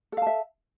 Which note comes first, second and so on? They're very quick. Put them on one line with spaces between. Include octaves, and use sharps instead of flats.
A4 F5 A5 E5